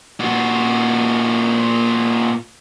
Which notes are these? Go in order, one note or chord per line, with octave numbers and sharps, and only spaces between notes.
A#2 F#4